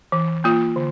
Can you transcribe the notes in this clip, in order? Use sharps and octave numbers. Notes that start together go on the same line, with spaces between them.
E3
A#3 F4
D3